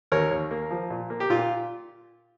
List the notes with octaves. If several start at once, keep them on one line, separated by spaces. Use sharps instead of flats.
D#2 A#4 C#5
D#2
A#3
F3
A#2
A#3
G4
A#2 F4